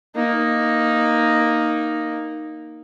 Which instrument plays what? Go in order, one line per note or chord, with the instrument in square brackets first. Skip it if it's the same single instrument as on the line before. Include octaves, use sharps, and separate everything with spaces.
[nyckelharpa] A#3 D#4